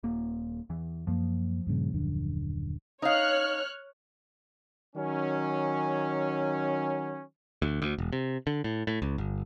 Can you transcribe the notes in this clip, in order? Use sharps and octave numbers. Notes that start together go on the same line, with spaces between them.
D#1 A#3
E2 E3
F#2 F3 A#3
G2 A#2 C#3
D#1 F#2 D3
D#4 C#5 F5 F6 F#6
D#3 F#3 C#4
D2
D2
E1
C3
D3
A2
A2
C#2
G1